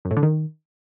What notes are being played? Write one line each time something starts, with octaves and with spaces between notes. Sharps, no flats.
F#2
A2
D3
D#3